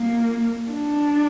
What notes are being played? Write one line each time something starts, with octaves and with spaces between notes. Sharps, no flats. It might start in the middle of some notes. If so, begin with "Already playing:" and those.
Already playing: A#3
D4